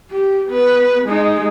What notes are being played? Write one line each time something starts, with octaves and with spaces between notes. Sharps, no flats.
G4
B3 B4
G#3 D#4